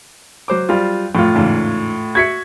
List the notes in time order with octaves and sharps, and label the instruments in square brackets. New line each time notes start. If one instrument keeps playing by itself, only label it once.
[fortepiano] F#3 C5 D6
[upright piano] G3 F4
[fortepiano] F2 [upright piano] A2 F4
[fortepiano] E2 G#2 C#3
[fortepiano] F#4 E5 [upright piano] G#6 B6 C#7